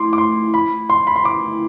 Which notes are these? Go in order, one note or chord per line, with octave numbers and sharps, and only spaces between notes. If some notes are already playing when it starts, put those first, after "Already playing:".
Already playing: A3 E4 C6 D6
D6
C6
B5
C6
B5
C6
D6